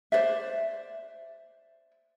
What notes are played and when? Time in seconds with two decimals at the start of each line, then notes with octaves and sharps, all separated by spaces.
0.12 C5 D5 E5